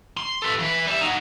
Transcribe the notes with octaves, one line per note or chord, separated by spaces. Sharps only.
C6
A4 B4
E3 B4
G3 E5
D#4 F#4